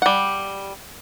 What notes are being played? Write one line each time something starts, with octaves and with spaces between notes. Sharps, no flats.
G3 F#5